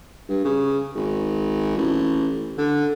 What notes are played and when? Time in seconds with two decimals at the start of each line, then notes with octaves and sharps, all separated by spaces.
0.29 G2
0.44 C#3
0.95 G#1
1.77 A1
2.58 D3